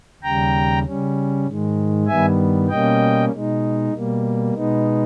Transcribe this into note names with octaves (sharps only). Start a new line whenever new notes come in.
D#2 C#3 G3 G5 A#5
C#3 G3 C#4
G#2 D#3 G#3
G2 D#3 G3 B3 E5 G#5
B2 G3 A#3 C#4 D#5 G5
B2 G#3 D#4
B2 G3 A#3
B2 G#3 B3 D#4